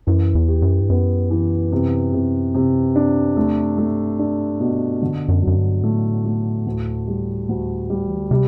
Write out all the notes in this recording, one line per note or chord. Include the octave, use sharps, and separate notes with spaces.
F#2 E3
E2
G4
F#2
G2
F#2 B3
E3
C3
C3
C3
D4
E2 A3
F#2
A3
G2
D4
B2
F#2 D3
G2
F#2
F#3
F#2
G2
A2 A3
A3
D2
G3
D2
G3
E3
D3
C3 G3